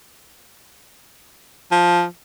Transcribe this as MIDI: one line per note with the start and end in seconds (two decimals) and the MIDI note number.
1.72 2.05 53